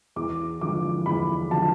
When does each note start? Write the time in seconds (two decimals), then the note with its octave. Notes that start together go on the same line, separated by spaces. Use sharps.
0.16 E2 D6
0.61 D3 F3 D6
1.06 E2 B5
1.51 D3 F3 A5